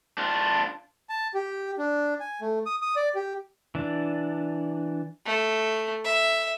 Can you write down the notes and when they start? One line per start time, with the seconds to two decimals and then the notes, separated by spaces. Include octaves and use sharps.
0.18 D4 F4
1.09 A5
1.34 G4
1.78 D4
2.20 G#5
2.41 A3
2.66 D#6
2.82 D#6
2.96 D5
3.15 G4
3.75 E3 D4
5.26 A3
6.05 E5